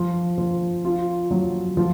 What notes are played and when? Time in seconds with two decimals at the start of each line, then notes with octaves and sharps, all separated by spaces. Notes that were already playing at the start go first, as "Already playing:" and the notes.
Already playing: F3
0.38 F3
0.85 F4
1.31 F#3
1.77 F3